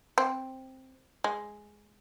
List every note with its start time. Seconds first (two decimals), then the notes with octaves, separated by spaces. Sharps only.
0.18 C4
1.24 G#3